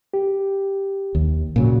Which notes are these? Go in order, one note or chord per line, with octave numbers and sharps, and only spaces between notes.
G4
D#2
A#2 C#3 F#3